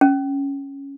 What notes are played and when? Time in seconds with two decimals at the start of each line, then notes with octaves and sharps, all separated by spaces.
0.01 C#4